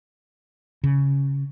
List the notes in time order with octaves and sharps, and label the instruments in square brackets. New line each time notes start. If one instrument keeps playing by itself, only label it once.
[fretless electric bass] C#3